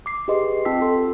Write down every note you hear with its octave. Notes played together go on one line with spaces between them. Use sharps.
D6 C7
G4 G#4 B4 D#5 C6
C4 F4 G5 A5 E6 B6
A4 C6